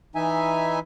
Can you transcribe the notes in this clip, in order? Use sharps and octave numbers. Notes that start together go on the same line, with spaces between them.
E3 D#4 E5 G#5